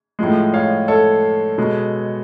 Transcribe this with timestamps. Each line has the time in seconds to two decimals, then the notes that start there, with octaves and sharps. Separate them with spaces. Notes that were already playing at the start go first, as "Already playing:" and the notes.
0.19 A2 F3 G#3
0.54 C#5 F5
0.88 A4 C#5
1.58 B2 G#3